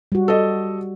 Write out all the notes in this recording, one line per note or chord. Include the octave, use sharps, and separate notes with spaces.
G3 F#4
A4 D#5